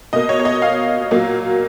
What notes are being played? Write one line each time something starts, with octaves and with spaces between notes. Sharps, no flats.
B2 A#3 D#5
C#5
C#5
D#5
F5
A#2 F#3 A#3